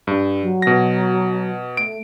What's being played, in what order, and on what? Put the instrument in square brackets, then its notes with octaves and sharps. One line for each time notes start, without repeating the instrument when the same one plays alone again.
[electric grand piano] G2
[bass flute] F#3
[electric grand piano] B2 A#6
[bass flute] A3 [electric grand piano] D7